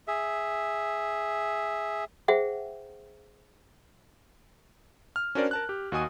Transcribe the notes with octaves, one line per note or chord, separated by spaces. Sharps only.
G#4 E5
G#4 C5 E5 F#5 G5
F6
C#4 D4 F#4 A#4 C5 D5
A#4 A5 F#6
G4
D#2 F#4 D#5 G#5 D#6 D#7